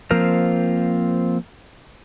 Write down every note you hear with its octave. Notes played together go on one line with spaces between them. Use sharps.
F3 A#3 C4 F4 A#4 C5